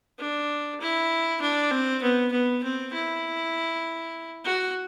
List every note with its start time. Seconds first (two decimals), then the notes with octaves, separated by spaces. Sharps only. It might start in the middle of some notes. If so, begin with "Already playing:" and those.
0.19 D4
0.80 E4
1.41 D4
1.71 C4
2.02 B3
2.32 B3
2.63 C4
2.93 E4
4.44 F#4